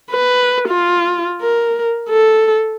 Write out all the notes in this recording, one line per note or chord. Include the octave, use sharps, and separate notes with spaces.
B4
F4
A#4
A4